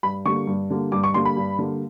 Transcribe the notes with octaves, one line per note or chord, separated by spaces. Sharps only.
G2 B5
D3 G3 A#3 C#6
G2
D3 G3 A#3
G2 D6
C#6
D3 G3 A#3 C6
B5
G2
D3 G3 A#3